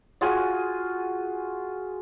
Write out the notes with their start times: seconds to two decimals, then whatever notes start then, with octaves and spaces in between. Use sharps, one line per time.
0.21 F4 F#4 G#4 G#5